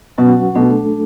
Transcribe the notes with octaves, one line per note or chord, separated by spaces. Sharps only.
B2 F#3 C#4 F#4 B4 F#5
B2 A3 D4 A4